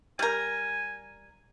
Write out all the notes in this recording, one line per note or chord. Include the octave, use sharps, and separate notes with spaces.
G3 A#4 G#5